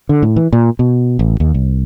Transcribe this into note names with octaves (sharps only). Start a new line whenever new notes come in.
D3
A2
E3
A#2
B2
A1
D#2
C2